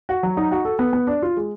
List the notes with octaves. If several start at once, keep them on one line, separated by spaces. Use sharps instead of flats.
F#4
F#3
D#4
F#4
A4
B3
B3
D4
F4
G#3